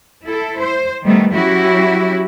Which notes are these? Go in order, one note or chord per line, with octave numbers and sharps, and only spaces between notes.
E4 A4
C5
D#3 G3 A3 B3
F#3 C#4 E4 F#4 G4